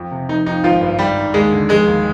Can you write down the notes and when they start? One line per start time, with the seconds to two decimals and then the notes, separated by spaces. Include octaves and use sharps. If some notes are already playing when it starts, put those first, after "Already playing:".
Already playing: F2
0.11 C3
0.29 F1 D#4
0.46 F2 D#4
0.64 G#1 F3 F4
0.81 G2
0.99 G#1 G3 G4
1.16 G#2
1.34 D#2 G#3 G#4
1.52 D3
1.69 F1 G#3 G#4
1.87 D#2